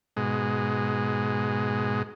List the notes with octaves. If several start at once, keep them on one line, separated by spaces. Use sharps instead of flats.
G#2 B2 G#3